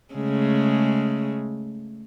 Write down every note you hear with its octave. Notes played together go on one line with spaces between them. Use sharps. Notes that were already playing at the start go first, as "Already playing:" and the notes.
C#3 G#3 A3